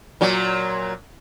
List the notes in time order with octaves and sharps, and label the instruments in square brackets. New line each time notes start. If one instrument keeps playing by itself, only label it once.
[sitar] A#2 F#3